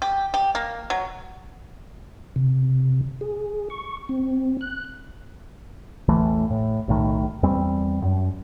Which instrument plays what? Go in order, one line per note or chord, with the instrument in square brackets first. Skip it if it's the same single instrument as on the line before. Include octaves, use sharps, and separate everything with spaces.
[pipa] G4
G4
A#3
F#3
[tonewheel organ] C3
G#4
C#6
C4
F#6
[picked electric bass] A1 E2 E3 A3
A2
B1 A2 D#3
E2 G3 C4
F#2